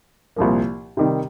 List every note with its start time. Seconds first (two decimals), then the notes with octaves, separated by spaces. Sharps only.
0.36 C2 A#2 F3 A#3
0.97 C3 D#3 G3